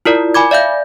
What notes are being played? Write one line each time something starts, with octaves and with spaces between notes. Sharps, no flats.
E4 F4 A#4 D5
G#5 B5 D6 G#6
D5 E5 F5 G6